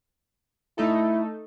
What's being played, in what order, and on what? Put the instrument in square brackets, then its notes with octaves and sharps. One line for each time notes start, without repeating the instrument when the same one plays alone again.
[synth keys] A3 D#4 A4 [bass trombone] E4